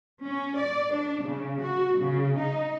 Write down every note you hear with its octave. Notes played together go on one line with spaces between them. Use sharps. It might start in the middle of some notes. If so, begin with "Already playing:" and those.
C#4
D5
D4
C#3
F#4
C#3
D#4